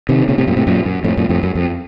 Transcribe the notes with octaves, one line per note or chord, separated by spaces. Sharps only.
C3 D#3
A#2 C#3
A2 C3
F#2 A#2
A2 C3
F#2 A#2
F#2
F2 A2
F#2 A#2
F2 A2
F#2
F2